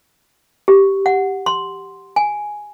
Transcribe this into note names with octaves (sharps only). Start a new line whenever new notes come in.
G4
F#5
C6
G#5